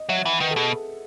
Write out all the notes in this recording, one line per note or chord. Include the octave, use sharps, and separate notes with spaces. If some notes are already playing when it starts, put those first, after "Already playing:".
Already playing: D#5
F#3 E5
E3 F#5
D#3 B4
A4
B2 G#4